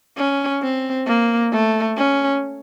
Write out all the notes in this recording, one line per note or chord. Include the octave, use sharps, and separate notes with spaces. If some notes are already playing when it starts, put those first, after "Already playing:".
C#4
C4
A#3
A3
C#4